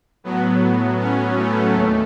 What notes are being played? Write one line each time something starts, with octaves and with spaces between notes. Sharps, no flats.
A2 F#3 B3
C#4
A3
D#2 A3